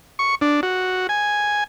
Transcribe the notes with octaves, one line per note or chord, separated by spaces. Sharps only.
C#6
D4
F#4
G#5